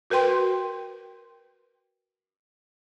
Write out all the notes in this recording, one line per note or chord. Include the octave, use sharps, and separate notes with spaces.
F#4 A#4 B4 G5 C6